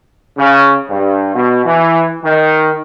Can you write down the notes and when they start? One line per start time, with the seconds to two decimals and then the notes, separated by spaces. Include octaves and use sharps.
0.37 C#3
0.89 G2
1.33 B2
1.64 E3
2.23 D#3